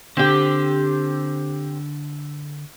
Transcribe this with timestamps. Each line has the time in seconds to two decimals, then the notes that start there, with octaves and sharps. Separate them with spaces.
0.17 D3 C4 G4